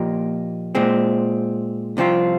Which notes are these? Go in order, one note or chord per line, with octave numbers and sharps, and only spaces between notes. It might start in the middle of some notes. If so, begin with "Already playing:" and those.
Already playing: A#2 F3 A#3 D#4 G4
A#2 G#3 C4
C2 C3 F3 C4 F4